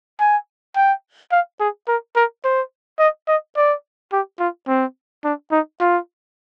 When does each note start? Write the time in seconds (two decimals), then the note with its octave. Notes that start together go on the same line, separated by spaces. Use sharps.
0.20 G#5
0.76 G5
1.32 F5
1.60 G#4
1.88 A#4
2.16 A#4
2.44 C5
2.99 D#5
3.28 D#5
3.57 D5
4.12 G4
4.39 F4
4.68 C4
5.24 D4
5.51 D#4
5.81 F4